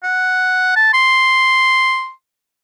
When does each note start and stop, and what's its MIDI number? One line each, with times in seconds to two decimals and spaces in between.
0.03 0.76 78
0.76 0.90 81
0.94 2.11 84